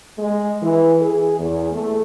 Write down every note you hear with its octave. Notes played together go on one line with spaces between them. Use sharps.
G#3
E3
G#4
E2
A3